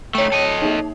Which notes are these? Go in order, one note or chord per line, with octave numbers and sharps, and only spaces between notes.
A3 D#4 C#5 G5
A4 D#5
A#3 D#4